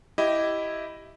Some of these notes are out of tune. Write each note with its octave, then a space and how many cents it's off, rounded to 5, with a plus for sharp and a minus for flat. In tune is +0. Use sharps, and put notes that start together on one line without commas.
E4 +0 G4 -10 D#5 +0